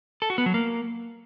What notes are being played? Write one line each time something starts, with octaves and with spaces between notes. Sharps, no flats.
A4
F#4
B3
F#3
A#3